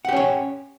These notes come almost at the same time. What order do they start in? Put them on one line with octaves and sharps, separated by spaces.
F#5 G4 C#4 C#5